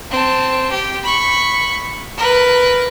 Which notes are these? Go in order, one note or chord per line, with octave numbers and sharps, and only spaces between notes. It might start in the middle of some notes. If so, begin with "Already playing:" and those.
C4 A5
G4
B5 C#6
A#4 B4